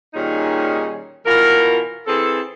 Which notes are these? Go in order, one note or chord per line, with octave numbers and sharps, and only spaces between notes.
A#2 D#3 G3 C#4 D#4 G#4
B2 E3 F4 A#4
E3 C4 G#4 A4